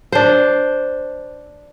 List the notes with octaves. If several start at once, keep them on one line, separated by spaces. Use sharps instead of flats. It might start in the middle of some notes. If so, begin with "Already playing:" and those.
D4 C5